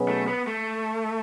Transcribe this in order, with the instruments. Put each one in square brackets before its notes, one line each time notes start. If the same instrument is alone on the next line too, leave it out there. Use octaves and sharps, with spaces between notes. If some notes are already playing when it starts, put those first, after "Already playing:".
Already playing: [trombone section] B2 F#3 C#4 G#4 B4
[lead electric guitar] A3
B3
A3